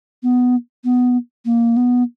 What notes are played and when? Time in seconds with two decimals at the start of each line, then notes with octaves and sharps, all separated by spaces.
0.23 B3
0.85 B3
1.46 A#3
1.77 B3